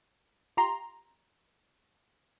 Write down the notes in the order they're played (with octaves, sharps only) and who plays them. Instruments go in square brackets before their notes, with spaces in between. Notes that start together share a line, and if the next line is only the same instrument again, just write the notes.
[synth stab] F4 G4 A#5 C6